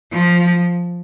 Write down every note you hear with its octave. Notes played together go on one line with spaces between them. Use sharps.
F3